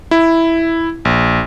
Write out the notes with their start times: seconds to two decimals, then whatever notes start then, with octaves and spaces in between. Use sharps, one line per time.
0.11 E4
1.05 A#1